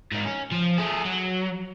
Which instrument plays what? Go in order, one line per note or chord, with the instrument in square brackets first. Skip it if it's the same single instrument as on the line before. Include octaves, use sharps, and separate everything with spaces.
[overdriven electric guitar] G#2 D#3
C#4
F3
A3 G#4
F#3